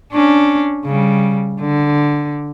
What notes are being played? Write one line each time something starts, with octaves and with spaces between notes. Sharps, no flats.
C#4 D4
C#3 G3
D3